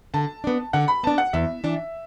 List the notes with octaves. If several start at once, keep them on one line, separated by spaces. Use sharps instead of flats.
D3 A5
B3 D4
D3 F#5
B5
B3 D4 A5
F#5
E2 E5
E3 D4